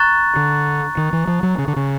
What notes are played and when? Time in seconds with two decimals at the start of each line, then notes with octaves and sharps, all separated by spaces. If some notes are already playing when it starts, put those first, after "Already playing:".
Already playing: A#5 C#6 F#6 A6
0.36 D3
0.97 D#3
1.13 E3
1.28 F3
1.43 F#3
1.58 C#3
1.68 D3
1.76 C#3